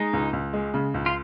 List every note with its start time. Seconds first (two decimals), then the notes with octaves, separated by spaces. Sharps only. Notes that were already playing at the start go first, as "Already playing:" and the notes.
Already playing: G#3 D#4
0.13 C#2
0.33 C#2
0.53 G#3
0.74 C#3
0.94 C#2
1.06 F4